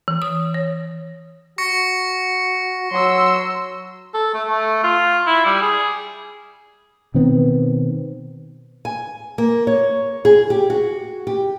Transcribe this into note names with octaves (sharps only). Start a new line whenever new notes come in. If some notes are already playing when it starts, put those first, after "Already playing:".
E3
D#6
C#5
F#4 C#6 A#6 C#7
F#3 C6 E6
A4
A3
A3
F4
E4
G3
G#4
B2 D#3 B3 C4
G#5
A#3
C#5
G#4
G4
F#4
G4